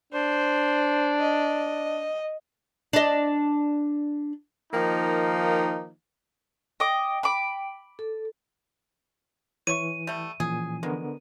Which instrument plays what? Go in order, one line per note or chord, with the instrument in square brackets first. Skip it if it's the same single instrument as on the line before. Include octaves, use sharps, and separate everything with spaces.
[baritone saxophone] D4 [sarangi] C5
[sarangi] D#5
[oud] D4 D#5
[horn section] D#3 F3 A#3 D#4
[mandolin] D#5 D6 [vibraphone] G5
[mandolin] B5 D6
[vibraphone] A4
[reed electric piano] E3 [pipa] C#5 E5 C#6 [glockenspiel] D#7
[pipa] G3 A3
[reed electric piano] A#2 G#5 [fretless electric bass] E3 F3 C#4 [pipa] G#4
[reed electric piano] D3 B3 A#4 [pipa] G#3